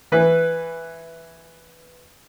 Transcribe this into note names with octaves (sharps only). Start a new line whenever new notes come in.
E3 B4